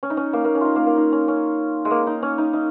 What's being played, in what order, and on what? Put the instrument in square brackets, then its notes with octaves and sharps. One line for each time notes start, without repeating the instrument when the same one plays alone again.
[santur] C#4
D#4
C#4
A#3
A#3
C#4
D#4 F4
A#3
A#3
D#4
C#4
C#4
G#3
A#3
D#4
C#4
D#4
D#4